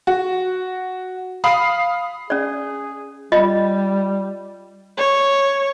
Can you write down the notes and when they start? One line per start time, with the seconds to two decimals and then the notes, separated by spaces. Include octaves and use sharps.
0.07 F#4
1.44 F5 B5 D#6 C7
2.30 C#4 G#4 D5
3.32 G3 F4 D#5 B5
4.97 C#5